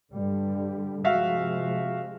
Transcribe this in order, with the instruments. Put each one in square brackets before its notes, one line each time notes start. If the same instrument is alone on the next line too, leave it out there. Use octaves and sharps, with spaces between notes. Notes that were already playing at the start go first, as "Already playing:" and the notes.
[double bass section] G2 D3 G3
[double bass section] C3 F3 G#3 [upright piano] F#4 E5 F5